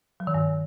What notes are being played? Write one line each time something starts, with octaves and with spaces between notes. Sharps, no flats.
F#3
D#3
G2